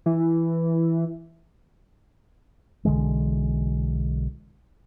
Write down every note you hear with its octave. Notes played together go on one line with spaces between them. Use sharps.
E3
B1 D3 E3 G#3